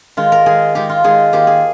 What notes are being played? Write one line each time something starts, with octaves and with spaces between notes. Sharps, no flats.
D#3 G#3 D#4 F4
A#4
D#3 G#3 D#4 G#4
D#3 G#3 D#4 G4
F4
D#3 G#3 D#4 G#4
D#3 A#3 F4 G4
G#4